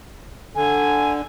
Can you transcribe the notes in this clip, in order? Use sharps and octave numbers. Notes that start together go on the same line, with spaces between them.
D3 G#5